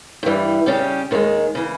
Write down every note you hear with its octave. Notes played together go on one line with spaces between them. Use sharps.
G2 E3 G3
C#3 G3 C#4 G4
D#2 D#3 G#3
C#3 E3